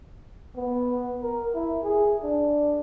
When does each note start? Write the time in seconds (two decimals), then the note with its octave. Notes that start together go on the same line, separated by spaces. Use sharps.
0.56 B3
1.22 A#4
1.55 E4
1.84 G#4
2.23 D4